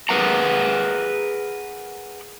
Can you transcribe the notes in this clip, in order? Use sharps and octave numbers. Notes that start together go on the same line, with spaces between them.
G#4 A#4 B4 F#5 A#5